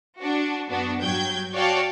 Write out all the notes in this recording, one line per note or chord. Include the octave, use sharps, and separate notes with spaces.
D4 F#4
F#2 B3 D4 F#4
G2 F#3 G5 G6 G#6
F#4 C#5 D5 F5 G5 A5